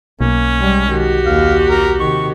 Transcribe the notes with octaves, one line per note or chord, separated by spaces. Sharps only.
B1 A#3 C#4
G3 G#3
D#3 F#4 G4
D#2 F5
A#4
C3 D#3 C#6